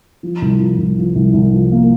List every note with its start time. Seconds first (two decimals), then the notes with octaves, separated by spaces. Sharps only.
0.23 F3
0.42 C2
0.60 F3
0.78 C2
0.98 F3
1.16 C2
1.34 C2
1.53 F3
1.72 A#3